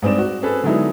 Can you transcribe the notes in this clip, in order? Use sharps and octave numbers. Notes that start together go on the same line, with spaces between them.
G2 G#3 C4 D#4 D5 E7
F#4
C4 C#4 G#4 A4 B4
D3 F#3 G#3 B3 D#4 E4